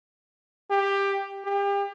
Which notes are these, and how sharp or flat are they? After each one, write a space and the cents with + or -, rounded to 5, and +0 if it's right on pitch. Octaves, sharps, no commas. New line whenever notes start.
G4 +15
G4 +35